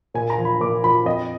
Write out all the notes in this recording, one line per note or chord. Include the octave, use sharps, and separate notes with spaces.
A#2 G#5
A#5
F3
B5
A#2 D6
F3 B5
F2 D#5